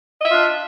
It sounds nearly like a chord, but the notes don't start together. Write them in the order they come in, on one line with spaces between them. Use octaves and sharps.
D#5 E5 F4 D4